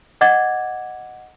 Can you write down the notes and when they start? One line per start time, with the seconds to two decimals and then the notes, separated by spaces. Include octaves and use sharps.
0.21 D#5 F#5 D6 G#6 A6